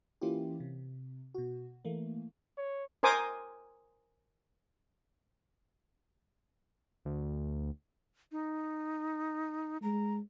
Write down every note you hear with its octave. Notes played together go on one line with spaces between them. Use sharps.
E3 A#3 C#4 E4 F4 G4
C3
B2 F#4
E3 A3 A#3
C#5
A#4 C5 G#5 D6 D#6
D2
D#4
G#3 A#5